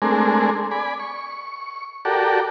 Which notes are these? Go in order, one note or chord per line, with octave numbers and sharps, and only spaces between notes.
G#3 A3 C4 D4 G#4 A#4
D5 G#5 B5
C#6
F#4 G4 A4 A#4 D5